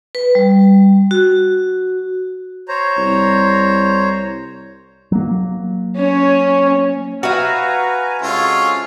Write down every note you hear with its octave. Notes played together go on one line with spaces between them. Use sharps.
B4
G3
F#4
C5 C#5 A#5
C2
F#3 A#3
C#4 C#5
F#4 B4 E5 F5 G#5 A#5
C3 G#3 C#4 F4 A4 C#5